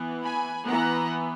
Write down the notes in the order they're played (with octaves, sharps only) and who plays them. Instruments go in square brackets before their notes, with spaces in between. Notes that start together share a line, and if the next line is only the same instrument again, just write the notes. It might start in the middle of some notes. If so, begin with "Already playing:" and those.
Already playing: [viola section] E3 B3
G#5 B5
E3 B3 F#5 A#5